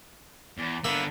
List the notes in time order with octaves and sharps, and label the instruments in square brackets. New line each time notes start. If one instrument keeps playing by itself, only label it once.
[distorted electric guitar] E2
[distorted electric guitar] D3 B3 [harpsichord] A#3 E5 B5